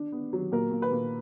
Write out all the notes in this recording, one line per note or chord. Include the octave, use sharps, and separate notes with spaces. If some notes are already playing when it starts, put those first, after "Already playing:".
Already playing: D4
B3
F#3
A#2 A#4
A#2
B4
A#2